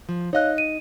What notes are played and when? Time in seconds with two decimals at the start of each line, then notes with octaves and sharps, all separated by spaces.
0.09 F3
0.33 D#4 C#5 D#5 F5 F#6
0.58 D#7